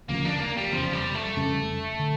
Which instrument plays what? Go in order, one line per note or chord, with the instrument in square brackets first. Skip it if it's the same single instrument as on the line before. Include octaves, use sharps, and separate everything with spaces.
[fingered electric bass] E1 D2 C#3 F3 [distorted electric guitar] A#3
[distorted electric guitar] D4
A#3
G3
[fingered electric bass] F1 E2 C#3 [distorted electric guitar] F3
[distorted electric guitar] G3
A3
[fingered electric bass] F2 C#3 G3 C#4
D3